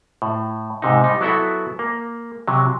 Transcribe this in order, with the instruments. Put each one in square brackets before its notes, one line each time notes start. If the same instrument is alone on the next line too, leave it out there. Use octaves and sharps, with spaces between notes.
[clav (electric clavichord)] A2
G#2 C3 D#4
G3 D#4
F#3 B3 E4 F#4 A4 E5
A#3
C3 F#3